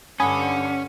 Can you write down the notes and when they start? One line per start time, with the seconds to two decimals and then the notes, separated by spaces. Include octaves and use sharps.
0.20 G2 D3 C#4 F#5 G#5 B5 D#6